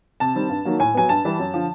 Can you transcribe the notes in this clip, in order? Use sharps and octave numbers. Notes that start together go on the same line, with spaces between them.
C3 A5
D#3 G3 C4
G2
D#3 F#3 A#3
A2 G#5
F#3 B3 G#5
G2 A5
E3 G3
F#2
D3 F3